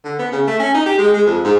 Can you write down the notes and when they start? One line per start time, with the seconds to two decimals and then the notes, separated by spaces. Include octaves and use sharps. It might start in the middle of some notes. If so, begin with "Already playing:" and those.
0.05 D3
0.19 B3
0.32 C#3
0.47 A3
0.60 C#4
0.74 D#4
0.86 G4
0.98 G#3
1.14 G#3
1.26 F2
1.45 G#2